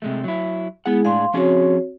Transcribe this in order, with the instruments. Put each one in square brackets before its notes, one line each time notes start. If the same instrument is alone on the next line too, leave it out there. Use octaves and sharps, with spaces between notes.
[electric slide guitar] C3 G#3 A3
F#3 E4
[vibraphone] G#3 E4 G#4 [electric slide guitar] B3 F#5
[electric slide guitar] A2 D4 G#4 [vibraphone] F5 C6
[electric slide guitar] F3 C#4 G#4 [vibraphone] C4 F#4 C#5